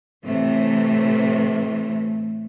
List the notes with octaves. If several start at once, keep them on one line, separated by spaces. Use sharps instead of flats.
A2 C3 E3 A3